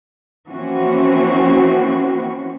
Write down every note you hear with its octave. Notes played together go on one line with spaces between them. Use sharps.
E3 F3 A#3 C4 C#4 F#4